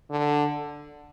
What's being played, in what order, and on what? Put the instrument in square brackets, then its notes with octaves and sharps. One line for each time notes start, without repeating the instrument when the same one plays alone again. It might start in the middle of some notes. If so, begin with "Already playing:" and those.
[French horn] D3